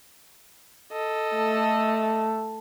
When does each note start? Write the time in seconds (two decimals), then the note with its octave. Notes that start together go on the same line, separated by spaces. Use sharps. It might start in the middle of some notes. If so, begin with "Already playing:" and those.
0.92 A4 D#5
1.36 A3